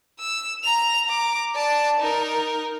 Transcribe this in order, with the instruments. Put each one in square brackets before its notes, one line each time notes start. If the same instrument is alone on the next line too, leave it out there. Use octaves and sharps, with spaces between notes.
[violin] E6
A#5 F7
A#5 D6
D5 A5
D#4 A#4